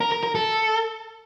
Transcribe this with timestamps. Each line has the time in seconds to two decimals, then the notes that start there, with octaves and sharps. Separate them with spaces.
0.01 A#4
0.12 A#4
0.23 A#4
0.35 A4